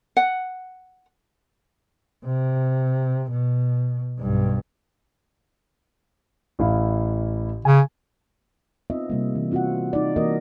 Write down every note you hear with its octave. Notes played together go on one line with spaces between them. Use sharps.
F#5
C3
B2
B1 G2
A1 E4 F5
C#3 G#5
B3 C4 D#4 F4 D#5 E5
C3 G3 A#3
E3
C4 F4 F#4 E5 F#5
D#4 D5
E3 A#3 D#4 F#4 A#4 D#5